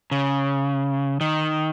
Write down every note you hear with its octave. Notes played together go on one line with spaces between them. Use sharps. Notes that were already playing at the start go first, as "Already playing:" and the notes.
C#3
D#3